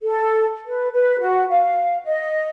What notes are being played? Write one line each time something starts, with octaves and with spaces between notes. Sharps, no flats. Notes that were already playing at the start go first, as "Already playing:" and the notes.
A4
B4
B4
F#4
F5
D#5